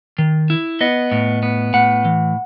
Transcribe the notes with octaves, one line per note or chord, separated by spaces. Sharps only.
D#3
E4
B3 D#5
A2
B3
A2 F#5
E3